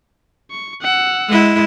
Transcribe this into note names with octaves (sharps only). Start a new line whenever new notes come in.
C#6
F#5 E6
G#3 E4